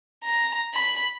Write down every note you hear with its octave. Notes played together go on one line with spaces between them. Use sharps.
A#5
B5